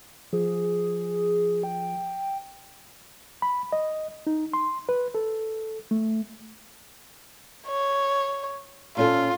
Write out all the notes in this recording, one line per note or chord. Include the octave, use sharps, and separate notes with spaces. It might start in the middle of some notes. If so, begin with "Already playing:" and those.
F3 G#4
G5
B5
D#5
D#4
C6
B4
A4
A3
C#5
A#2 C#4 F4 A4